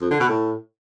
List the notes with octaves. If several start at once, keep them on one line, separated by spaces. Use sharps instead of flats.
F2
D3
B2
A2